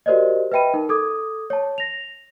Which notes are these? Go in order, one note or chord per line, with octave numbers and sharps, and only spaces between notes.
F#4 G4 A#4 C5 D5 D#5
B4 D#5 E5 G5 B5 D#7
D#4 A#4
A4 D6 D#6 G#6
C#5 A5
A#6 F7